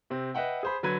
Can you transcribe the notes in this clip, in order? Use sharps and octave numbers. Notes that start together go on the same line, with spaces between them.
C3 C4
B4 D#5 E5 F#5 G5
G#4 C5 B5
D3 F#3 B4 B5 G#6 D#7